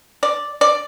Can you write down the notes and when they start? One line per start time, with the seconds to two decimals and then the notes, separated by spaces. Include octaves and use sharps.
0.23 D5
0.61 D5